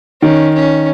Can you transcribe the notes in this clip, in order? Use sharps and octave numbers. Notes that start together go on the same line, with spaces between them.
D#3 C#4
C#4